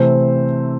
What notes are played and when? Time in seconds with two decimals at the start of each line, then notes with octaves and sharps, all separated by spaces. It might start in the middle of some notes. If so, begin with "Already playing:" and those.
Already playing: C3 E3 A3 C4 C5